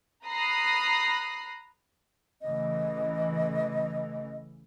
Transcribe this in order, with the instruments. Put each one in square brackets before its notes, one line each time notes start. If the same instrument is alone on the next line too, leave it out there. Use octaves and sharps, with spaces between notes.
[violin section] A#5 B5 D#6 F#6 A#6 C7
[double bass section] A1 C#3 E3 [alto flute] D#5